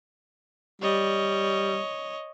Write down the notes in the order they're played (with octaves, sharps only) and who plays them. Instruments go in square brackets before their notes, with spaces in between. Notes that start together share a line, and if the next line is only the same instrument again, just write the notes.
[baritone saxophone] G3 [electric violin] C#5 D#5